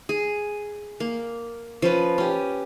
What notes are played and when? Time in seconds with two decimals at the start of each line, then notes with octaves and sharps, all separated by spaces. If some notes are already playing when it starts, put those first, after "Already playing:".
0.09 G#4
1.00 A#3
1.82 F3 C#4 B4
2.18 C#4 G4